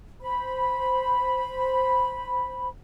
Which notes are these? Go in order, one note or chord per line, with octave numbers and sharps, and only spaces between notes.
C5 B5